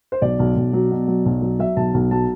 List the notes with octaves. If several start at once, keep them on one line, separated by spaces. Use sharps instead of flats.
C5
B1 D5
B1
B1
F#3
B2
F#3
B1
F#3
F#3 E5
B1 A5
B1
F#3 A5